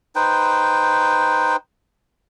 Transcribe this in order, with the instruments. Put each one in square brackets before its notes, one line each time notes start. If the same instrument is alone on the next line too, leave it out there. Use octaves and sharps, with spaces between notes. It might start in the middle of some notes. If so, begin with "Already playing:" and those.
[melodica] D#4 B4 C5 G5